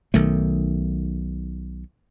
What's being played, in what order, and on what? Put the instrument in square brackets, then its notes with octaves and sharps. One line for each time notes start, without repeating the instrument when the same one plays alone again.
[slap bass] B1 D#3 A3